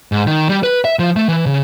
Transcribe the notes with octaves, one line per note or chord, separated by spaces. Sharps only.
G#2
D#3
G3
B4
E5
F3
A3
E3
C#3